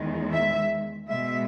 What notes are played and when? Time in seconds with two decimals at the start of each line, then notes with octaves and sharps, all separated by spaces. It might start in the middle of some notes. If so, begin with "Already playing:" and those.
Already playing: E2 D#3 G#3
0.33 E5
1.08 B2 G#3 E5